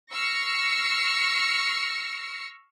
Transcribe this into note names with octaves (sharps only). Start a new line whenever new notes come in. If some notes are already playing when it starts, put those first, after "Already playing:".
C#6 E6 F6 A#6 C7 C#7